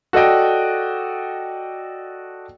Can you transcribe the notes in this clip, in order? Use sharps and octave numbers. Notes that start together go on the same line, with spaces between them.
F#4 A4 D5 D#5 G5